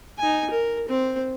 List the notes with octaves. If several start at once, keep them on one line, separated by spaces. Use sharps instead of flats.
D#4 G#5
A#4
C4 C5